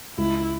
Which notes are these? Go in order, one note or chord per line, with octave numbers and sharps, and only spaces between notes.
C#2 E4